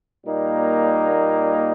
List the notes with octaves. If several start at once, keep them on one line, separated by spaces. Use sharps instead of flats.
A#2 G3 A#3 D#4